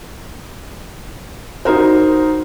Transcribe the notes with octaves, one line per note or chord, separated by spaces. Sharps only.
D#4 F#4 A#4 C5